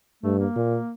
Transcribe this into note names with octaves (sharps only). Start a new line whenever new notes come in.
G2 A3
A#3
A#2